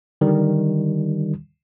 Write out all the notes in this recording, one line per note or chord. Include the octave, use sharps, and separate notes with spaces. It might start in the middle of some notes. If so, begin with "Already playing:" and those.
D3 D#3 G3